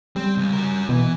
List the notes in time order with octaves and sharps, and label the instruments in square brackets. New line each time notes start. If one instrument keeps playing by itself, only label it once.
[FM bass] G3 [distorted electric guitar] C4
[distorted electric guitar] C#2
F#4 A#4
[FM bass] B2 [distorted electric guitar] E3